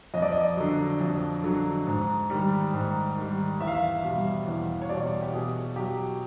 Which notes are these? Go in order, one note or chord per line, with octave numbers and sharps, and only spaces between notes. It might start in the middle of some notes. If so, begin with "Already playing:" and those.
F2 D#5
D5
D#5
D3 F#3
F2
D3 F#3
G#2
D#3 G3
G#2
D#3 G3
E2 E5
F5
E5
B2 G3 F5
E2
C#5
B2 G3 D5
G4
B2 G#4
F#3 G4